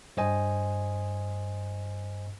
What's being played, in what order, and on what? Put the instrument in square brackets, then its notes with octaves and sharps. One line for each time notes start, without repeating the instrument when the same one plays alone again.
[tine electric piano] G2 C5 D#5 G#5